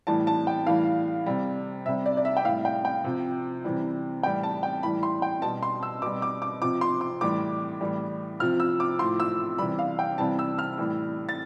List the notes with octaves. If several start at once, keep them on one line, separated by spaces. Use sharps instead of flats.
A2 E3 G3 A5
A5
G5
A2 E3 G3 F5
C3 G3
C3 G3 E5
D5
D5
E5
G5
A2 G3 F5
G5
G5
C3 F3
C3 E3 G3
A2 E3 G3 G5
A5
G5
A2 E3 G3 B5
C6
G5
B2 G3 A5
C6
E6
B2 G3 D6
D6
D6
C3 F3 D6
C6
D6
A2 E3 G3 D6
A2 E3 G3
C3 F3 F6
E6
D6
A2 F3 C6
E6
C3 E3 G3 B5
F5
G5
C3 E3 G3 A5
E6
F6
A2 E3 G3
A6